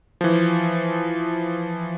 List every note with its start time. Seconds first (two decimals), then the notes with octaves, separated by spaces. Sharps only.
0.21 E3 F3